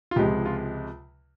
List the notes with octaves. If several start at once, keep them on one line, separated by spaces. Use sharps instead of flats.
F4
C#2 C3 F3 G#3 G4
F4